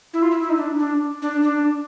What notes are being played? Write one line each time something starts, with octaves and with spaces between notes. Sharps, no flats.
E4
F4
E4
E4
D#4
D4
D4
D4
D4